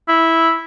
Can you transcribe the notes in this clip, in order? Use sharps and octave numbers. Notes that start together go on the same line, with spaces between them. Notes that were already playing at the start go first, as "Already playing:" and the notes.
E4